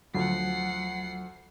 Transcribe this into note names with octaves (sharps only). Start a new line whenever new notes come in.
D2 F3 F#3 F#5 C7